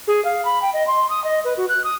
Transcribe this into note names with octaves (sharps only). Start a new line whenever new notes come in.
G#4
F5
B5
G5
D#5
C6
D#6
D#5
B4
F#4
F#6
D#6